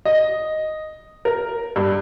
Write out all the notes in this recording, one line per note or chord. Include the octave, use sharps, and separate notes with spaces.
D#5
A#4
G2